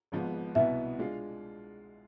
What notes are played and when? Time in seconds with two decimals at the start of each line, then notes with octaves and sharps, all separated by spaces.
0.12 G#1 G#2 F3 B3
0.55 C2 B2 B3 E4 E5
0.99 G#3 D4 F4